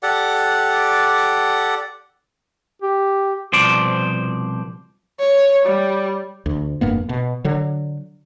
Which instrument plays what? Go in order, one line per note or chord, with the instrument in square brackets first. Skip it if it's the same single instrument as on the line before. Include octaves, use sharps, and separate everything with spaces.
[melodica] G4 A4 D5 F#5
[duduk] G4
[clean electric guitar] C2 B2 F3 C5 D5
[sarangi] C#5
G3
[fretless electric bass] D2
F1 G2 A#3 B3
B2
D3 F#3